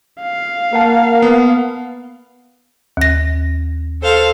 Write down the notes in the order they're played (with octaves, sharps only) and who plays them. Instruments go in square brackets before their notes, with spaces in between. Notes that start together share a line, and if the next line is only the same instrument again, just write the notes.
[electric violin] F5
[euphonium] A#3 [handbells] A#4 F#5 A5
[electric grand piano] B3
[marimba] D#2 A#6
[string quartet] A4 C5 F5